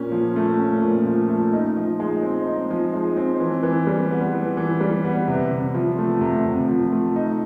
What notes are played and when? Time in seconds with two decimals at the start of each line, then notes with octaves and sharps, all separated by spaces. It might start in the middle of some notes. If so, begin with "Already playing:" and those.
Already playing: A#2 C#4
0.12 F3
0.36 A3
0.59 C#4
0.82 A#2
1.06 F3
1.29 A3
1.53 D#4
1.76 F3
2.00 G#3
2.23 C4
2.46 D#4
2.71 F3
2.94 G#3
3.16 C4
3.40 E3
3.63 E3
3.87 G3
4.11 B3
4.34 E3
4.57 E3
4.81 G3
5.05 B3
5.28 C3
5.51 C3
5.74 F3
5.98 A3
6.21 C3
6.45 C3
6.69 F3
6.92 A3
7.16 D#4